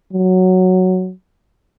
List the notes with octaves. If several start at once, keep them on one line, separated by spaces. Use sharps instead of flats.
F#3